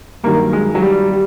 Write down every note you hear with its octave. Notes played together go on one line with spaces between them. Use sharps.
G2 D#3 F#3 A#3
G#3
F#3
G3
G3